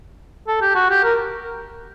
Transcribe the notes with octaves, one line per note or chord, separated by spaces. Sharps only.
A4
G4
F#4
G4
A#4